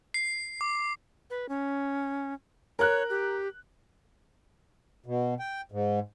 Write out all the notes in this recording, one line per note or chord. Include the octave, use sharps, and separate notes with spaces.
C7
D6
B4
C#4
A#4 C#5 F#6
G4
B2
G5
G#2